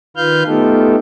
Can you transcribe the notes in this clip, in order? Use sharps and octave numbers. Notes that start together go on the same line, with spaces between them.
D#3 F4 B4 F5 F6 G6
A3 B3 D#4 F4 G4 A4